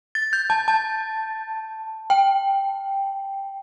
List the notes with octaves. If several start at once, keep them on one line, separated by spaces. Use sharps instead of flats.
A6
G6
A5
A5
G5